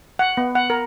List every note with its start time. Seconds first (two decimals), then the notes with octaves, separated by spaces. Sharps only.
0.19 F#5
0.37 B3
0.55 F#5
0.70 A#4